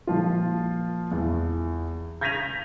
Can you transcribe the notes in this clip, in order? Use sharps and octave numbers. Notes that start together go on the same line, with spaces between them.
A#2 F3 F4
E2
G6 G#6 A#6 B6 D#7 F7